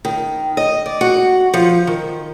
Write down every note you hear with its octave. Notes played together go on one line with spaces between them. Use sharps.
D#3
D#5
D5
F#4
F3
D#3